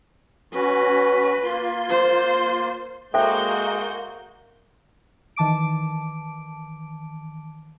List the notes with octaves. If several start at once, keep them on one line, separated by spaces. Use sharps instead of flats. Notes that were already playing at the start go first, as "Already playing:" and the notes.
C#4 F#4 B4
A#3 F4 C6
C5
G#3 A#3 F#4 A4 C5 E5 G5 G6
D#3 E3 A5 D6 D7